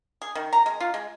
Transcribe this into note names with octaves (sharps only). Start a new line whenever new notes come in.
G#4
D#3
A#5
G#3
F4
G#3